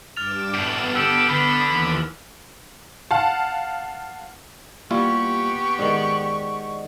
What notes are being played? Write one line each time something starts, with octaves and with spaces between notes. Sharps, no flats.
G2 D6 F6 A6 E7 F7
F#2 A2 B3 E7
D4 G4 A4 E6
D3 B5
D#2 E3
F5 F#5 A5
G3 A#3 B3 E4 F4 G4 C#6
G#2 D#3 D5 D#5 F#5